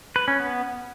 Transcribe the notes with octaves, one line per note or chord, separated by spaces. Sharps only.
B4
C#4
B3